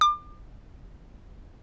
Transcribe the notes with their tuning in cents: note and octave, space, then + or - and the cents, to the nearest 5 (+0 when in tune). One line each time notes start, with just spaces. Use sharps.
D6 +35